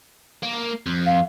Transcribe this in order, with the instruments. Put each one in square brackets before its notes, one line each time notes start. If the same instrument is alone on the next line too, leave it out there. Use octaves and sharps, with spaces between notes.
[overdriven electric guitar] A#3
F2
[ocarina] F5